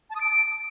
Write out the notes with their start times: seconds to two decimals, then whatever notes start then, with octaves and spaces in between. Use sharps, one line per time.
0.10 A5
0.15 D#6
0.21 D7